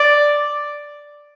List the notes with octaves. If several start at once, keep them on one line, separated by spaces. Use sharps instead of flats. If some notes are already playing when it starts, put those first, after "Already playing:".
Already playing: D5